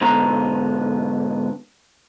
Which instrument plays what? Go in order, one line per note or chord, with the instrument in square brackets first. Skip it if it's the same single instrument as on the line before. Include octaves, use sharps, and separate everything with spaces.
[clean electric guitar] G#2 B2 D3 B3 A#5